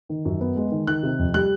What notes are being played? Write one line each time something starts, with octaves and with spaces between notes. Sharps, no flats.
D#3
F#2
B3
G#3
D#3
D#3 F#6
C3
F2
G3 F#6